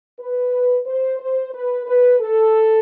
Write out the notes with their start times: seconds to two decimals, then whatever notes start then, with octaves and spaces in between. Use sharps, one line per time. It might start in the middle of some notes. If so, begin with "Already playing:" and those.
0.20 B4
0.86 C5
1.20 C5
1.53 B4
1.87 B4
2.20 A4